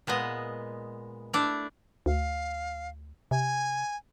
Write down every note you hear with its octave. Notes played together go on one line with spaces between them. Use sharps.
A#2 G#3 B3 D#5
A3 D4 E4 D5
D2 F5
C3 G#5